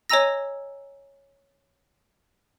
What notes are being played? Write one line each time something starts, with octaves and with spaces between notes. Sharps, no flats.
C#5 D#5 G#5 A#5 E6 A#6